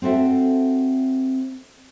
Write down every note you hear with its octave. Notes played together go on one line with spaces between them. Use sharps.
C4 F#4 A4 E5